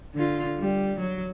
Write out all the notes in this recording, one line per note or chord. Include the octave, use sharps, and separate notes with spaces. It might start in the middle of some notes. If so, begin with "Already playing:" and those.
D3 F4
G3
F#3